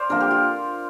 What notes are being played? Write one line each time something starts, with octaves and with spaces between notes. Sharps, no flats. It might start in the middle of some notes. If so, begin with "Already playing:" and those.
Already playing: C5 D5 F5
D3 F3 A#3 A#4
G4
F4